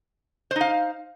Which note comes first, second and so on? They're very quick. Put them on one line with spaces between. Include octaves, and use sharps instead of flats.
C5 D#4 F5